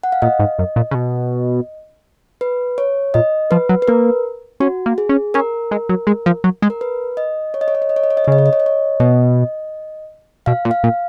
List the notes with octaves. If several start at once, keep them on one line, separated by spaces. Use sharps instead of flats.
F#5
F5
A#2 D#5
G#2
F#2
A#2
C#3
B2
B4
C#5
A#2 D#5
F3 B4
F#3
B4
A#3 A#4
C#4 F#4
A#3
G#4
C#4
C#4 A#4
G#3
F#3
G#3
F3
F#3
G#3
A#4
B4
D#5
C#5
D#5
C#5
D#5
C#5
D#5
C#5
D#5
C#5
D#5
C#5
C#3 D#5
C#5
D#5
C#5
D#5
C#5
B2 D#5
B2 F5
A#2
F5
A#2